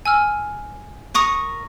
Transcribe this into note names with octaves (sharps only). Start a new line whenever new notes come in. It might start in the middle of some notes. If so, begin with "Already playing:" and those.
G#5 E6 F6
A#4 C#6 D#6